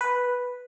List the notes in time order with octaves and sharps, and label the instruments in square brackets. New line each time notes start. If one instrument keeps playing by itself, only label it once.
[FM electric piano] B4